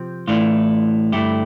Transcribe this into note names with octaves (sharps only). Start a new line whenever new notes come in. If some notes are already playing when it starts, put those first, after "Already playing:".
Already playing: C3 F3 C4
A2 E3 A3 D4 F4
G2 D3 A3 E4 G4